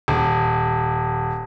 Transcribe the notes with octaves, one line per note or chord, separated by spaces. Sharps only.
D#1